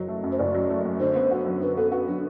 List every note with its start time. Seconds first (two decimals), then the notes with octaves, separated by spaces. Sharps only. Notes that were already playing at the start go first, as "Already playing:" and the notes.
Already playing: F#1 F#3
0.08 A3
0.24 F#2
0.32 C5
0.39 F#1 D5
0.54 F#3
0.70 A3
0.85 F#2
1.00 D3 C5
1.15 B3
1.31 F#4
1.46 F#3
1.62 D3 B4
1.77 B3 A4
1.92 F#4 B4
2.08 F#3 D4